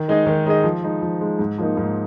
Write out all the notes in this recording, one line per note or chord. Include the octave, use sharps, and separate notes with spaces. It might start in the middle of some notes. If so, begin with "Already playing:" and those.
Already playing: D#3
G#3 D#4 G#4 D#5
D#3
G#3 D#4 G#4 D#5
F3
G#3 D#4
F3
G#3 D#4
G#2
F3 A#3 D#4
G#2